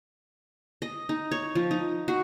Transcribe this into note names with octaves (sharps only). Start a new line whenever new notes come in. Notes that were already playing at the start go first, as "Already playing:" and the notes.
D#5
D#4
C#5
F3
D#4
F#4